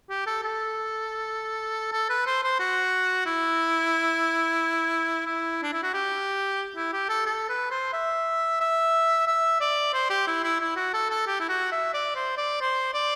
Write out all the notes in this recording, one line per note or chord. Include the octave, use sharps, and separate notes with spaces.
G4
A4
A4
A4
B4
C5
C5
F#4
E4
E4
D4
E4
F#4
G4
E4
G4
A4
A4
B4
C5
E5
E5
E5
D5
C5
G4
E4
E4
E4
F#4
A4
A4
G4
E4
F#4
E5
D5
C5
D5
C5
D5